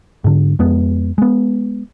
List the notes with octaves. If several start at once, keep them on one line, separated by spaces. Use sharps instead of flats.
G#2 D3
F2 G#3 B3
G#3 B3